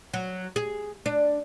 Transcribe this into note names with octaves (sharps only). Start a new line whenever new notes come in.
F#3
G#4
D4